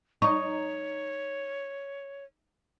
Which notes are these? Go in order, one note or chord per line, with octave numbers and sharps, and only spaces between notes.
D#4 C#5 C#6